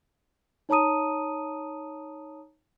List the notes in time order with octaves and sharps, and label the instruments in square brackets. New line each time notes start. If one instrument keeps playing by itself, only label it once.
[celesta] D#4 C#5 A5 A#5 D#6 D#7